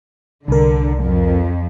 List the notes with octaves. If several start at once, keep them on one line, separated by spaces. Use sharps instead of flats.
C2 D3 A#4
F2